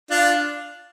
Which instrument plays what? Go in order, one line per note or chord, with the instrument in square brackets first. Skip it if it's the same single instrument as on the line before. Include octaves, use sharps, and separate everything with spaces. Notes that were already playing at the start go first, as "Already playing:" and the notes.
[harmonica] D4 F4